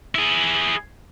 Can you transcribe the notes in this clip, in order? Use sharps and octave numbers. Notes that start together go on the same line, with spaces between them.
E4 G#4